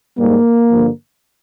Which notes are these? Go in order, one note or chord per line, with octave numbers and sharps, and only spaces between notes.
G#2 G3 A#3
G2 D3 F3